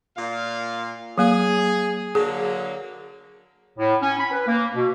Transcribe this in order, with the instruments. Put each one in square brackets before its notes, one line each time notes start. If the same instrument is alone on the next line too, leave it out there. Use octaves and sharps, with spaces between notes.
[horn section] A#2 F5
[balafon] F#3 A#3 [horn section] G#4
[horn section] D3 F#3 A#3 [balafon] G#4
[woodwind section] A2
C#4
B5
B4
A#3
B2